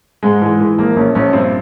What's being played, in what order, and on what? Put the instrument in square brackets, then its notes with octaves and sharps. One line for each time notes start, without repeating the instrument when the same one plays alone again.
[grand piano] G#2 G#3
E3 G#3
E3 G#3
A#1 A#3
A#1 C#4
A#1 C#4
G2 C4